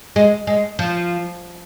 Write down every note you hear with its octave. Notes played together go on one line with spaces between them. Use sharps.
G#3
G#3
F3